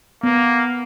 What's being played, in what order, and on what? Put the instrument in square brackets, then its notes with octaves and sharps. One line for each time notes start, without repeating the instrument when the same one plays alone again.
[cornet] A#3 [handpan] B3